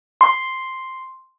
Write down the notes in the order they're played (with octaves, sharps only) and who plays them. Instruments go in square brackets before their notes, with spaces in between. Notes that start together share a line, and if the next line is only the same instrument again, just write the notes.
[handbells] C6